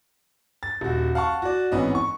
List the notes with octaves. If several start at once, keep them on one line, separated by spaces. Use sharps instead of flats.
A6
D#1 F#4
F5 F#5 A5 C#6
F#4 D5
G#1 E3 B3 C#4 D#5
C#6